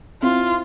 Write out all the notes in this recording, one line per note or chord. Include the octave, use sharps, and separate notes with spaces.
C4 E4 F4